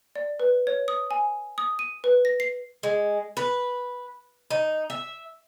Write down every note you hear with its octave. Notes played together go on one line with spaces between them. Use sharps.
D5
B4
C#5
D#6
G#5
D#6
D#7
B4
A#6
C7
G#3
B4
D#4
E5